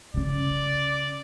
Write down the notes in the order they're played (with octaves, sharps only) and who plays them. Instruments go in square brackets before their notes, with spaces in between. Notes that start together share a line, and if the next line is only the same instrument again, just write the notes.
[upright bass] C#3 C#4 [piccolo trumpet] D5